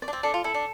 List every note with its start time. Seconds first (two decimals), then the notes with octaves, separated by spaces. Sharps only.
0.02 D5
0.08 D4
0.13 C4
0.23 D4 A4
0.34 F4
0.44 E4 A4
0.54 D4